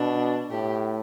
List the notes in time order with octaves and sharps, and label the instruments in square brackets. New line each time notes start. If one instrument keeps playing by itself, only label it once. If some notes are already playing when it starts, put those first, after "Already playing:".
Already playing: [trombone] B2 [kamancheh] D4
[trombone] A2 [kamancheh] G4